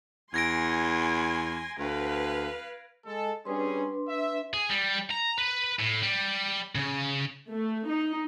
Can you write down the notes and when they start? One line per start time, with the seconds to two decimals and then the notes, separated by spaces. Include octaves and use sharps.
0.34 E2 G#5 C6 G#6 A#6 D7
1.79 D2 B4 F5
3.06 G#3 A4
3.45 G3 C#4 D4 G#4 B4 C6
4.08 E5
4.54 G#4
4.70 G3
5.11 A#5
5.38 B4
5.80 A2
6.03 G3
6.75 C#3
7.51 A3
7.89 D#4